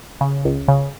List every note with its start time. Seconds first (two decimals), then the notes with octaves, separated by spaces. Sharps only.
0.21 C#3
0.45 C#2
0.68 C#3